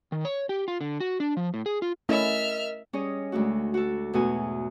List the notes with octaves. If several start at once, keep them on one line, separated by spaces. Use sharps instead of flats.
D#3
C#5
G4
F4
D3
F#4
D4
F3
A2
G#4
F4
A3 C#4 E4 A#4 D#5 E5 F6
G3 C#4 G#4 C#5 D#5
D2 G#3 A3 F#4
F#4 A4
E2 G#2 B2 A3 F#4 G#5